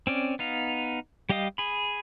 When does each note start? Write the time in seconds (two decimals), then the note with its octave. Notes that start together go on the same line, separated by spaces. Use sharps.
0.07 C4 C#4 D5
0.39 B3 D#4 F5
1.29 G3 G4 D#5 F5 D#6
1.58 G#4 B5